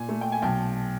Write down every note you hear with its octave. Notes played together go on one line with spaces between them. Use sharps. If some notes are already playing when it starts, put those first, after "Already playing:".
Already playing: A#2 G#5
A3
G5
G#5
B1 G5 A5